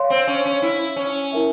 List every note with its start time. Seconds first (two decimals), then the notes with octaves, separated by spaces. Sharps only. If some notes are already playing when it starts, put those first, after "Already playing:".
Already playing: C#5 F5 C6
0.10 C4
0.27 C#4
0.45 C#4
0.62 E4
0.96 C#4
1.32 E4 A#4 E5 G#5